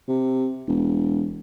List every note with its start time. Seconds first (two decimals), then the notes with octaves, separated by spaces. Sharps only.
0.08 C3
0.68 E1